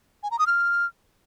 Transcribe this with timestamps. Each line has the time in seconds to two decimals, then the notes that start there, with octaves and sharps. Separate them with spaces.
0.23 G#5
0.31 A#5
0.39 D#6
0.47 F6